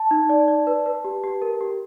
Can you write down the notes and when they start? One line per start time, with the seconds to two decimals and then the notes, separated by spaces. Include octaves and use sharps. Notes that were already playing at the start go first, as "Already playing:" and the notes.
Already playing: A5
0.11 D#4
0.29 D5
0.48 D5
0.67 B4
0.86 B4
1.04 G4
1.24 G4
1.42 A#4
1.61 G4